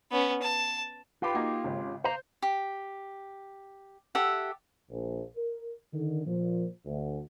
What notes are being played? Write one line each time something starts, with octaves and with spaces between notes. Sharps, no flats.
B3 C#4
A5
F4 G4 B4 G5 B5
A#3 D#4 F#4
G#1 C#3
C5 F5 A#5
G4
G4 A4 E5 F#5
A#1
A#4
D3 D#3
A#2 F3
D2